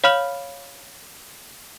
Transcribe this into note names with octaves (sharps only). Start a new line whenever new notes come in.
C#5 F5 B5 F6 F#7